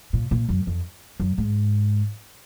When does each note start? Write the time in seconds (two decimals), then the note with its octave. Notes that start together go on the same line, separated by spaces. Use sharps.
0.13 A#2
0.31 A#2
0.49 F#2
0.67 F2
1.20 F#2
1.38 G#2